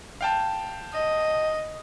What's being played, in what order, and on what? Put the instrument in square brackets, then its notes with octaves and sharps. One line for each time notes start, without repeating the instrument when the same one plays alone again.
[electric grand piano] F5 G5 A5
[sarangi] D#5